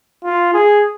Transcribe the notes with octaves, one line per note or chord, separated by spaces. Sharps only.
F4
G#4